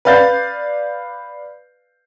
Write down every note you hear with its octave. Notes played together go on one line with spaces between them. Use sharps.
B4 D5 F5 G6 A6